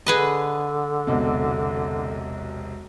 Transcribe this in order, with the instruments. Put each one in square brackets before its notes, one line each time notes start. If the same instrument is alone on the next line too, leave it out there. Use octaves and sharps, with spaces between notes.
[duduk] D3 [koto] G#4 B4 D#5
[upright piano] E1 B1 C3